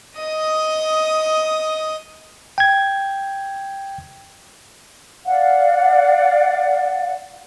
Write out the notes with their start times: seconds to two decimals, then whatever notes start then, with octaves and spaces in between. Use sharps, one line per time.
0.18 D#5 D#6
2.58 G5 G#6
5.26 D5 F5 F#5